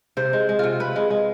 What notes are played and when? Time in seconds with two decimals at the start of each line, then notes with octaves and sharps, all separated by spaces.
0.17 C3 C5
0.33 G#3
0.49 G#3
0.59 C3 F4
0.80 C3 B4
0.96 G#3
1.10 G#3